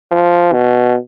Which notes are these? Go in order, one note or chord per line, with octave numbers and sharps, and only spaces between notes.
F3
B2